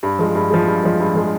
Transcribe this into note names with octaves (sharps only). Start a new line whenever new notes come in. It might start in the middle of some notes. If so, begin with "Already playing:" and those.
G2
F3 G#3
G2
F3 G#3
G2
F3 G#3
G2
F3 G#3